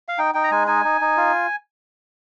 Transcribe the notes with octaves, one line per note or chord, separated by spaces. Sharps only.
F5
D#4 G5
D#4 G5
A#5
G#3 G#5
D#4 G#5
D#4
D#4
F4